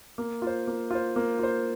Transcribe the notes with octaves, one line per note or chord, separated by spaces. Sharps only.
A#3
F4 C5
A#3
F4 C5
A#3
F4 C5